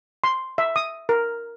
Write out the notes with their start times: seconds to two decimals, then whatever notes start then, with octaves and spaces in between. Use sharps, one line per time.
0.24 C6
0.58 E5
0.76 D#6
1.09 A#4